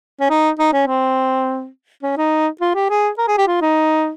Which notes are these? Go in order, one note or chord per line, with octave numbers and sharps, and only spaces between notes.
C#4
D#4
D#4
C#4
C4
C#4
D#4
F4
G4
G#4
A#4
G#4
G4
F4
D#4